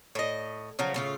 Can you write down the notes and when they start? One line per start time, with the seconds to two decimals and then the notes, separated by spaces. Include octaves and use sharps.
0.15 A2 D#5
0.79 C#3 F3 F#3
0.94 A2 C#3 F4